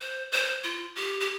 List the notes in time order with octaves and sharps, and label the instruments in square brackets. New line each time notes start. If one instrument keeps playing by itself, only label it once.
[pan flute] C5
C5
F4
G4
G4